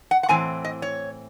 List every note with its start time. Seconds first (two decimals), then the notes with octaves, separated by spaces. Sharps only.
0.11 F#5
0.23 F#5
0.29 A2 E3 C4 G#5
0.65 D#5
0.82 C#5